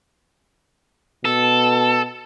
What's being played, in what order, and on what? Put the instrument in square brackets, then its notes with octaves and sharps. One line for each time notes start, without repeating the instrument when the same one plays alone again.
[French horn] B2 [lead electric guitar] A4